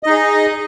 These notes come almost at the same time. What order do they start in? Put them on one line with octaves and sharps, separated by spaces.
D#5 D#4 G#4